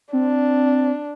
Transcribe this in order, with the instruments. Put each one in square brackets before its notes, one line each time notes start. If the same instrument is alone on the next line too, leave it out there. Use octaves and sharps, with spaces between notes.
[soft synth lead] C4 [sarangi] D4